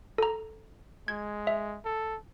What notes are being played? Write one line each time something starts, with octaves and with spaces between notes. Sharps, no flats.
A4 A#5
G#3 G#6
E5
A4